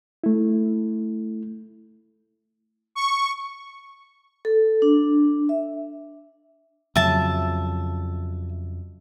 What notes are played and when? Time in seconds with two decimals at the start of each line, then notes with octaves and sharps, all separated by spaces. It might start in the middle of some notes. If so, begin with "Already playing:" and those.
0.24 A3 E4
2.95 C#6
4.45 A4
4.82 D4
5.49 E5
6.96 F2 C#3 F#3 E5 A5